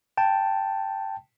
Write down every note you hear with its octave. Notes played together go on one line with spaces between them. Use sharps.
G5 A5